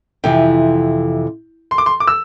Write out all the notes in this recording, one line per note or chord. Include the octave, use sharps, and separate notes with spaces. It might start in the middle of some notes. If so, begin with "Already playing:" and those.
F2 C3 E3 G5
C6
D6
C6
D6
E6